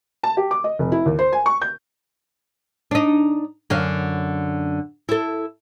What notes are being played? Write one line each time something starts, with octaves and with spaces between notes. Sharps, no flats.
A5
G4
D6
D#5
F1
E4
D#2
C5
G#5
C#6
G6
D4 D#4
F#2 D3 F5
E4 A4